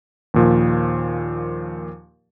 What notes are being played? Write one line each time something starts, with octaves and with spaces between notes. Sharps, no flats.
D#2 A#2 F3